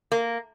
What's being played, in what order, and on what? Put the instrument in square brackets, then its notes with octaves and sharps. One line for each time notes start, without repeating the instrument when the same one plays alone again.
[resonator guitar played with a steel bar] A#3